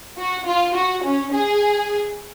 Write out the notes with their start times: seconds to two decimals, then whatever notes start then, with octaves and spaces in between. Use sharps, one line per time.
0.17 F#4
0.46 F4
0.74 F#4
1.03 C#4
1.32 G#4